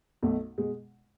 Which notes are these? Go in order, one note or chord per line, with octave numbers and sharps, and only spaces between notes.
B1 B2 A3
B2 G#3